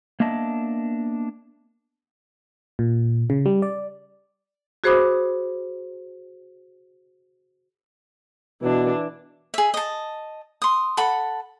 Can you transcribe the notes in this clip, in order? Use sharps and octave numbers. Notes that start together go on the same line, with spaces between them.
A#3 B3 D4 D#5 E5 A5
A#2
C#3
G3
D5
F#4 G#4 C5 B5 D6 D#6
B2 E3 D4
G#4 E5
D#5 A5
C6 D#6
A4 F#5 B5